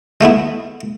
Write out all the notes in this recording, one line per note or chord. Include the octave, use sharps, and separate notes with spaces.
G#3 A3 B3 E4